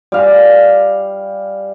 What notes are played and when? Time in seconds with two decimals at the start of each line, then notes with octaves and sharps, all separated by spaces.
0.12 G3 F5 G#5